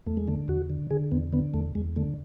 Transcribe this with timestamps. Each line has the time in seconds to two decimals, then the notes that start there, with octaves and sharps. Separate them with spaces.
0.06 E2 A3
0.17 G#3
0.27 D3 A3
0.48 E2 F#4
0.70 D3
0.91 D3 G#4
1.11 E2 B3
1.33 D3 B3
1.54 E2 A3
1.75 E2 G#3
1.96 D3 A3